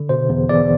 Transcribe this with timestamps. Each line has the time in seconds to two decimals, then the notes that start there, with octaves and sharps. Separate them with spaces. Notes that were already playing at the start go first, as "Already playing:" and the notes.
Already playing: D3
0.09 B2 C5
0.29 E2
0.49 E2 D5